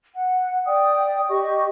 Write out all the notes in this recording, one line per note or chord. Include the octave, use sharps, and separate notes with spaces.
F#5
D5 G5 D#6
G4 D#5 C#6